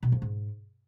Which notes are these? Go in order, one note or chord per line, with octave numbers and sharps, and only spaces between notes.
B2
F3
G#2